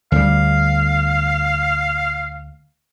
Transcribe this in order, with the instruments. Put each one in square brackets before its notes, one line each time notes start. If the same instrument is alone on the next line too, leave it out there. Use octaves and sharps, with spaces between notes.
[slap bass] D2 G3 [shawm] F5